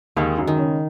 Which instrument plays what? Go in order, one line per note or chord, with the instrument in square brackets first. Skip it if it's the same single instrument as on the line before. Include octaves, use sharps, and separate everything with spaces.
[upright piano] D#2 D#3 [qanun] G#3
[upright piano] F#2 F#3
[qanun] D#3
[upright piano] C#3 C#4